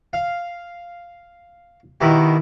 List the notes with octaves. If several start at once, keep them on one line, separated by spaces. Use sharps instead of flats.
F5
B2 D#3 E4 G4